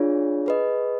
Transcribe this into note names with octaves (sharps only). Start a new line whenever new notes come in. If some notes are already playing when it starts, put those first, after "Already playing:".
Already playing: D4 F4 G#4 C#5
G#4 B4 D#5